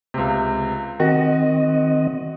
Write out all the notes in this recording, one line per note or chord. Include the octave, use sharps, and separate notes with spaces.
C#2 C3
D#3 C4 F#4 D#5